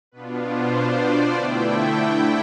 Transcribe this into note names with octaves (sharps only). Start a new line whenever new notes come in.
B2 B3 D4 F4 B4
C5
D5
D3 A3 E4 G5